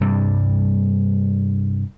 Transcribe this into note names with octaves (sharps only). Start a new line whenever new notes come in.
G2 C3 G3